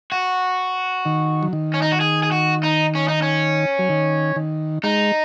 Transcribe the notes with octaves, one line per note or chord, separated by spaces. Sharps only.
F#4
D#3
F#3
D#3
C#4
D#4
F#4
G#4
G#4
F#4
D#4
C#4
D#4
C#4
F#3
D#3
D#3
G#3 D#4